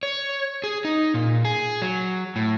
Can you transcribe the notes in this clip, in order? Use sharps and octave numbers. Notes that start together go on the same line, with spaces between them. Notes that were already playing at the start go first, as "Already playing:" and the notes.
C#5
G#4
D#4
A#2
G#4
F#3
A2